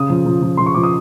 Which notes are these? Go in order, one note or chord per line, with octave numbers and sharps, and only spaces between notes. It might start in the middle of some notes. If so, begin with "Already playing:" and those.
Already playing: C#3 D#6
F3
F3
F3
F3 C6
C#6
F3 D6
D#6